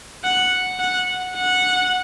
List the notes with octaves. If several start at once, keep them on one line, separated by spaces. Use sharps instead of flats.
F#5
F#5
F#5